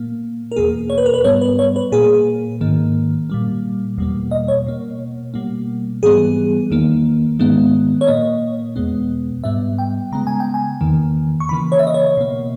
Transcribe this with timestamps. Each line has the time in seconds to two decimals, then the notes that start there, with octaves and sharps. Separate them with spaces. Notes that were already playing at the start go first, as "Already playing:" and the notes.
Already playing: A#2 A#3
0.52 A#4
0.56 E2 B2 A#3 G#4
0.90 C#5
0.98 B4
1.06 A#4
1.14 B4
1.24 G#2 G3 B3 C#5
1.41 B4
1.59 C#5
1.76 B4
1.92 A#2 A#3 G#4
2.61 G#2 D#3 A#3
3.30 A#2 G3 A#3
3.97 E2 B2 G3 A#3
4.31 D#5
4.48 C#5
4.67 B2 A#3
5.34 B2 G3 A#3
6.03 G#2 E3 G3 B3 G#4
6.71 E2 D#3 A#3
7.39 G#2 D#3 G#3 B3
8.01 C#5
8.07 A#2 A#3 D#5
8.76 E2 B2 G#3 B3
9.44 G#2 G3 B3 E5
9.78 G5
10.12 C#3 G#3 B3 A#5
10.27 G#5
10.40 G5
10.54 G#5
10.81 E2 D#3 A#3
11.40 C#6
11.49 C#3 E3 A#3 B5
11.72 C#5
11.79 E5
11.87 D#5
11.94 C#5
12.17 B2 A#3